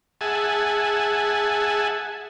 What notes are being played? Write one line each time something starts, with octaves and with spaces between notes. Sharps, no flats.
G#4 E5 F#5 G#5 A5